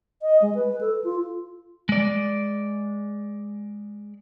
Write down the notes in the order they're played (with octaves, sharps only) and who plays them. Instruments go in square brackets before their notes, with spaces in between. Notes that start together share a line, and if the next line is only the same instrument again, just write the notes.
[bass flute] D#5
G#3
B4
A4
F4
[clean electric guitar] G#3 D5